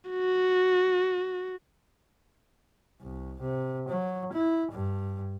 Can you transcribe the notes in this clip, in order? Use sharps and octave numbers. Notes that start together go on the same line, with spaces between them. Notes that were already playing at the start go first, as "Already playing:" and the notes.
F#4
C2
C3
F#3
E4
G2